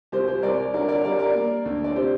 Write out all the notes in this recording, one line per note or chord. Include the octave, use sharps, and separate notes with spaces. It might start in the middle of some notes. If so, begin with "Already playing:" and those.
C2 G4 C5
G4 C5
C2 A#4 D5
D3 A#4 D5
A#4 D5
G3 A#4 D5
A#4 D5
A#3
D2
D5
C3 G4 C5